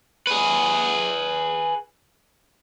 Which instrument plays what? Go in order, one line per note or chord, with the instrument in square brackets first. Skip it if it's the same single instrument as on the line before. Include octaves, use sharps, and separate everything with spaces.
[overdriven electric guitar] G#4 B4